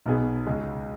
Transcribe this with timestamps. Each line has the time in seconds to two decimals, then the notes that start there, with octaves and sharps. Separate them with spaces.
0.06 B1 B2 B3 G#4
0.47 C#2 C#3 G#3